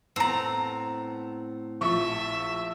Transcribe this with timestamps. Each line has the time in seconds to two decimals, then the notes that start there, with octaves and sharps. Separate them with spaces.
0.16 A2 B3 C4 A5 A#5 E6
1.81 A#1 F3 E5 C#6